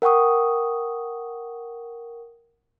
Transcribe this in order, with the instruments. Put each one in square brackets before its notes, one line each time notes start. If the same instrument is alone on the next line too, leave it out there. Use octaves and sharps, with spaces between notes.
[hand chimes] A#4 F#5 G5 C#6 D#6